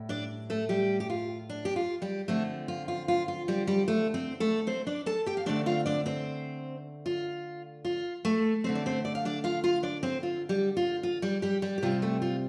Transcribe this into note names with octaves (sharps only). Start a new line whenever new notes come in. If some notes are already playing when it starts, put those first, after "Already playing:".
Already playing: A2 G3
D4 D5
A3 A4
G3 G4
G4
F4
D4
G4
F4
G3 G4
D3 F3 A3 C4 A4
F4
F4
F4
F4
G3 G4
G3 G4
A3 A4
C4 C5
A3 A4
C4 C5
D4 D5
A4 A5
G4 G5
F5
D3 A3 C4 D4 D5
F4 F5
D4 D5
C4 C5
F4
F4
A3 A4
D3 A3 C4 C5
D5
C4 C5
D5
F5
D4 D5
F4 F5
F4 F5
D4 D5
C4 C5
F4
G3 G4
F4
F4
G3 G4
G3 G4
G3 G4
G4
C3 G3 C4 F4
A3 A4
F4